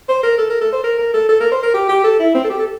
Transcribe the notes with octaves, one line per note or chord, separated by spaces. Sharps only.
C5
A#4
A4
A#4
A4
C5
A#4
A#4
A4
A4
A#4
C5
A#4
G4
G4
A4
E4
C4
A4
G4
A4